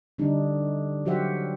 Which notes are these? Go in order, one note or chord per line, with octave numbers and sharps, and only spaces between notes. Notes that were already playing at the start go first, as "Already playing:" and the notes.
D3 G3 D4 D#4
F#3 F#4 G4 C5 E5 F#5